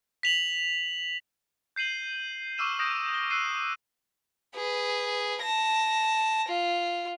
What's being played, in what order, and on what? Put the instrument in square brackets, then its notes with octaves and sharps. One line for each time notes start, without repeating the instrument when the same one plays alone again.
[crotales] B6 F7 F#7
G6 C7 D#7 F#7 G7
C#6 D6 E6 F6 D#7 E7
D#6 F6 G6 A#6 D7
G7
E6 F#6 A#6 C7 D#7
[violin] G#4 B4
A5 A#6
F4